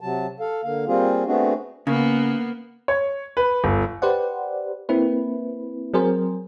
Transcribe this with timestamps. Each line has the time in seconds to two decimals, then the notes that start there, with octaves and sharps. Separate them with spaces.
0.01 C3 F#3 A5
0.40 A4 F5
0.64 D3 A#3 F5
0.88 G3 A#3 C4 F4 G#4
1.27 A3 B3 C4 D4 F#4 G#4
1.87 C#3 A#3 B3
2.88 C#5
3.37 B4
3.64 G1
4.02 G4 B4 C5 D5 F#5
4.89 A#3 C4 E4 B4
5.94 F#3 C4 G#4 A#4 C5